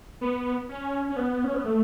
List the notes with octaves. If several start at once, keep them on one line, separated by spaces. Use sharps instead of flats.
B3
C#4
C#4
B3
C#4
B3
A3